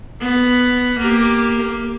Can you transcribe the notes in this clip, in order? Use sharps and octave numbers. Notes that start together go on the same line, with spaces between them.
B3
A#3 G4